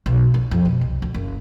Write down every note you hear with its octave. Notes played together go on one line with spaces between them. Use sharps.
B1
D#4
F2
B2
C2
D2
F#1